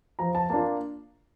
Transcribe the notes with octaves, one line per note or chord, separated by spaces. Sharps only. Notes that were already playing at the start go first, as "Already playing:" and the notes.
F3 A#5
A5
A#3 D4 F4 A5